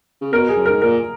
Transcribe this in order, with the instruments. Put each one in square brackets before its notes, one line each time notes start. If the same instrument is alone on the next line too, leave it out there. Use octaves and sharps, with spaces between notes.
[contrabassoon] C#3
[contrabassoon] B2 [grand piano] A#4
[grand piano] G#4
[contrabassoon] F#2
[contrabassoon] G#2 [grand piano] A#4
[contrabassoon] A#2 [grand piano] A#4